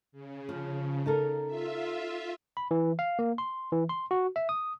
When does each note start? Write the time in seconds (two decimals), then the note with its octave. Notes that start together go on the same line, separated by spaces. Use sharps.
0.12 C#3
0.49 F3
1.06 D#4 A4 A#4
1.46 F4 E5
2.57 B5
2.71 E3
2.99 F5
3.19 A#3
3.38 C6
3.72 E3
3.89 C6
4.11 F#4
4.36 E5
4.49 D#6